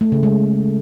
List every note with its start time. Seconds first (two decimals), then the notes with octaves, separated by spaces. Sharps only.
0.01 A3
0.12 C#3
0.23 G#3